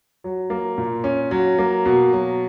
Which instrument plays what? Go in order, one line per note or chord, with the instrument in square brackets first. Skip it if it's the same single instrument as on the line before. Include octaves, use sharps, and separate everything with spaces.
[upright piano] F#3
A#3
A#2
C#4
F#3
A#3
B2
F#3